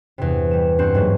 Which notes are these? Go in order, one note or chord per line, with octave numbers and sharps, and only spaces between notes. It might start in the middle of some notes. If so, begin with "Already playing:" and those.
E2 G2 C3
G3 E7
G2 C4 C5 F#5 C6 E7
G#2 F#3 A3 A#3